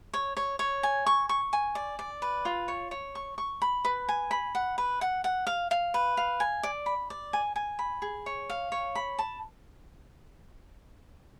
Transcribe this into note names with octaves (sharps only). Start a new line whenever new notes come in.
C#5
C#5
C#5
G#5
C#6
C#6
G#5
D5
D5
B4
F4
C#5
C#5
C#6
C#6
B5
B4
G#5
B5
F#5
B4
F#5
F#5
F5
F5
B4
F5
G#5
D5
B5
D5
G#5
G#5
B5
G#4
C#5
F5
C#5
B5
A5